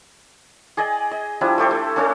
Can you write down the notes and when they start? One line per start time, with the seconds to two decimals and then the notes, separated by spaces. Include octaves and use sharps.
0.77 G#4 D5 D#5 G#5
1.11 D#5
1.41 F3 G3 D4 E4
1.58 A3 G4 A4 C5
1.71 A3
1.96 A3 C#4 D4 A4